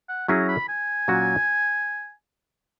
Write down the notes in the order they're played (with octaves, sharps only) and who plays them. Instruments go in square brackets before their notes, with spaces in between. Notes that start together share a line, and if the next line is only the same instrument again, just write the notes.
[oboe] F#5
[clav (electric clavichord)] F#3 C#4 E4 G#4 [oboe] A#5
[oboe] B5
G#5
[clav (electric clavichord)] A#2 F#3 C#4 F#4